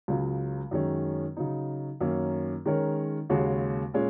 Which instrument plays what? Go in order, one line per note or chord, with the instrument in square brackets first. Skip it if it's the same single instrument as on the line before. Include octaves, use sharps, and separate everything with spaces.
[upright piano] C#2 C#3 F#3
F#2 D#3 G#3 C#4
C#3 F#3 D#4
F#2 D#3 A#3 C#4
D#3 G#3 C#4 A#4 C#5
D#2 C#3 G#3 F#4 C#5
A#2 G#3 C#4